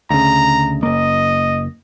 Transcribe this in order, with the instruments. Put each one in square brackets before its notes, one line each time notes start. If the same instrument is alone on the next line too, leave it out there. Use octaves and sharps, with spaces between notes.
[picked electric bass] D2 C#3 [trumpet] A#5
[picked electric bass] F#1 A#3 [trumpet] D#5